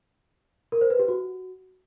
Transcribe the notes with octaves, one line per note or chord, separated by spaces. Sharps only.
A#4
C5
B4
G4
F#4